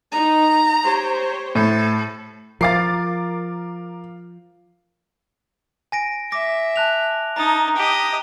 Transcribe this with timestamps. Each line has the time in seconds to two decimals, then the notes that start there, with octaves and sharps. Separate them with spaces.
0.12 D#4 A#5
0.84 G4 C5 C#5
1.55 A2 A4
2.61 F3 A#4 F5 D6 A6 C7
5.92 G#5 A#6 D7
6.32 E5 D6 A#6
6.76 A5 F#6 F7
7.36 D#4 A5 A#5 D#6
7.76 G4 D#5